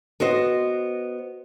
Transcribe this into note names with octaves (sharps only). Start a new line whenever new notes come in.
B3 F#4 C5 D#5